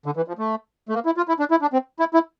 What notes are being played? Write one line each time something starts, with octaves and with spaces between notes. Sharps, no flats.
D3
E3
F3
A3
A3
A#3
E4
F4
E4
D4
E4
D4
C4
E4
E4